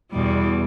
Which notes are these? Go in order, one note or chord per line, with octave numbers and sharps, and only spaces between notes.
E2 B2 G3